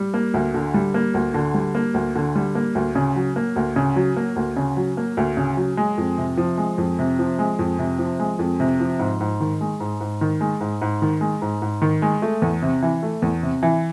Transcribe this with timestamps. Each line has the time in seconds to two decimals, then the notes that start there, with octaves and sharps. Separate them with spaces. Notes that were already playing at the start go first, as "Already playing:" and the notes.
Already playing: G3
0.14 A#3
0.34 D2
0.54 D3
0.74 G3
0.94 A#3
1.14 D2
1.34 D3
1.54 G3
1.75 A#3
1.94 D2
2.16 D3
2.36 G3
2.55 A#3
2.75 D2
2.95 C#3
3.16 F#3
3.36 A#3
3.56 D2
3.76 C#3
3.96 F#3
4.17 A#3
4.36 D2
4.57 C#3
4.77 F#3
4.97 A#3
5.17 D2
5.37 C#3
5.57 F#3
5.77 G#3
5.98 F2
6.18 C3
6.37 F3
6.58 G#3
6.78 F2
6.99 C3
7.19 F3
7.39 G#3
7.59 F2
7.79 C3
7.99 F3
8.20 G#3
8.39 F2
8.60 C3
8.80 F3
8.99 G#2
9.20 G#2
9.41 D#3
9.61 G#3
9.80 G#2
10.01 G#2
10.21 D#3
10.41 G#3
10.61 G#2
10.82 G#2
11.02 D#3
11.21 G#3
11.42 G#2
11.62 G#2
11.82 D#3
12.02 G#3
12.22 A3
12.42 E2
12.62 C3
12.82 E3
13.03 A3
13.22 E2
13.43 C3
13.63 E3